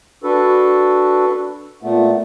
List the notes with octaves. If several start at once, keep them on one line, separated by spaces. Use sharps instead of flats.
D4 F#4 A4 B4
A#2 A3 B3